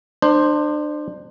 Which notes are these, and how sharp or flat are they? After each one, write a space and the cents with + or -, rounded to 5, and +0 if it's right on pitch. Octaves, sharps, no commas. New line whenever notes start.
D4 +35 C5 +0